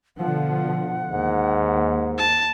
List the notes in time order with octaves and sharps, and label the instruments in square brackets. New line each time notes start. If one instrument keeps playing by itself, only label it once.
[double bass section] B2 D3 F3 [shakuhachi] F#5
[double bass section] D#2 [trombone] G#2
[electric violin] A5